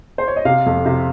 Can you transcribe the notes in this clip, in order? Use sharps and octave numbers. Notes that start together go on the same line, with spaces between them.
C5
C#5
D#5
C3 F5
F2
C3